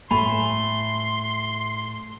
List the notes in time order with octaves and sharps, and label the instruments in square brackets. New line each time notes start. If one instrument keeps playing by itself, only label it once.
[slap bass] A2 [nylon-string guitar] A3 G#5 [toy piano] B5 [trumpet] C6